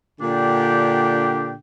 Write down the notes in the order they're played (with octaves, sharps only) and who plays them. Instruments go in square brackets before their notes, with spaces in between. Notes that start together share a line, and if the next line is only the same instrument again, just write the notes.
[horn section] A#2 D3 D4 G4 G5